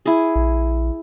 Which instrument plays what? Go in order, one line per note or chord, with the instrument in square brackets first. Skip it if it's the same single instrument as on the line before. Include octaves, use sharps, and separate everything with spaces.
[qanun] E4 G#4
[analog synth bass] A#1